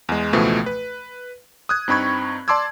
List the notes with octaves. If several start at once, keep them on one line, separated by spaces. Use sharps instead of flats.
E2 G#3
C#2 B2 E3 F3 A3
B4
D#6 F#6 G#6
G2 C4 D#4 B5 C#6 G#6
D5 A5 C6 D6 E6 G#6